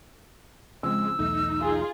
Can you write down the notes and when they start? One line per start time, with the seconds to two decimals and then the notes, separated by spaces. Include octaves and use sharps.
0.83 C#3 F3 G#3 C4 E6
1.19 B1 E2 A3 D#4
1.60 F4 G#4